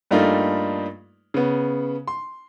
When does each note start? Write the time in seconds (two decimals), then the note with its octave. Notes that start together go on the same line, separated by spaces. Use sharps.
0.11 G2 G3 A3 A#3 D#4 F4
1.34 C#3 B3
2.08 C6